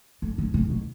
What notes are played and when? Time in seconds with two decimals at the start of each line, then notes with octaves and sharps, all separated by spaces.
0.22 D3
0.38 D3
0.54 C3
0.70 B2